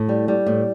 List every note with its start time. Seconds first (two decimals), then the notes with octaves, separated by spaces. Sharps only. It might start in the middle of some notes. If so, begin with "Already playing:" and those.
Already playing: A2
0.09 G3
0.28 G3
0.46 A2